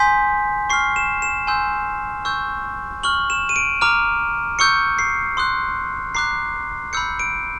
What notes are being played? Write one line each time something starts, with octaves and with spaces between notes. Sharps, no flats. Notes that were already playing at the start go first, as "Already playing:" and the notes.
Already playing: G#5 C6 D#6 G6 B6
C#6 F6 C7
E7
E7
G#5 C6 E6 G6
C#6 E6 G6
C#6 F6 F#7
E7
D#7
D7
A#5 D6 F6
C#6 E6 G6 C#7
C7
C6 D#6 F#6
A#5 D6 F#6 C7
B5 E6 G6 C#7
D7